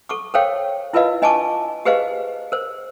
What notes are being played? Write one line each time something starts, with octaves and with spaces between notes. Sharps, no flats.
A4 C#6 D6
A4 A#4 C5 C#5 F5 G5
E4 F4 A#4 B4 D#5 F5
D4 D#5 G#5 A5 C#6 D6
G4 G#4 B4 C5 D#5 F5
A#4 C5